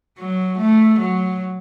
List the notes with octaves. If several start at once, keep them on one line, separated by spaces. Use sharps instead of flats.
F#3
A3
F#3